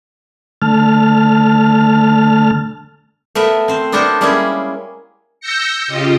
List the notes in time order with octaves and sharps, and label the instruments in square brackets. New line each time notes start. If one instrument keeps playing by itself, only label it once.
[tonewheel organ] D3 A3 A5 F6
[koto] A3 B3 A#4 E5
C4 C5
B3 D4 F#4 A4 A#4 C5
G3 G#3 A#3 C#4 E4 G#4
[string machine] E6 G6 A#6 C#7
C#3 F4 G4 D#5